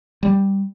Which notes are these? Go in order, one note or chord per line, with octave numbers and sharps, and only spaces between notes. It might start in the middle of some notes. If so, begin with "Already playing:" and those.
G3